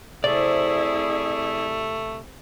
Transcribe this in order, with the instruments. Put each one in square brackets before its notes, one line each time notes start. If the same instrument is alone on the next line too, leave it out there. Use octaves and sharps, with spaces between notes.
[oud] C3 [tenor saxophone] A3 [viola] E4 G#4 [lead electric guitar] D5